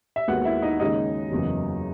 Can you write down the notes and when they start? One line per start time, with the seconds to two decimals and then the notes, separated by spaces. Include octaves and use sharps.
0.16 E5
0.28 D#2 D#3 G#3 B3 F#4 F#5
0.45 E4 E5
0.62 D#4 D#5
0.79 D#2 C#3 G#3 C#4 D#4 D#5
1.31 F#1 E2 C#3 F#3 B3